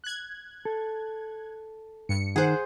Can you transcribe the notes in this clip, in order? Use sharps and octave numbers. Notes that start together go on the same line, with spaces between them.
F#6 G#6
A4
G2 C#7
D#3 G#4 C5 F#5